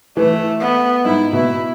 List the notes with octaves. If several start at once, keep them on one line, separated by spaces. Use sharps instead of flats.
E3 A3
B3
G#2 E4
B2 E4